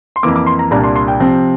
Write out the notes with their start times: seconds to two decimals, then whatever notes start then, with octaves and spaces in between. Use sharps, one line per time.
0.16 C6
0.23 F2 E3 A#3 D6
0.36 D6
0.47 C6
0.59 A#5
0.71 C2 A#2 G3 A#3 D4 A#5
0.84 C6
0.96 C6
1.08 G5
1.20 C3 F3 C4